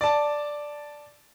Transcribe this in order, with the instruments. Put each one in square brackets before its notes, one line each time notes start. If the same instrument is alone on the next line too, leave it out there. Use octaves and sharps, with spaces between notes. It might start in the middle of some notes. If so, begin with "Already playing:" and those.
[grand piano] D5 A5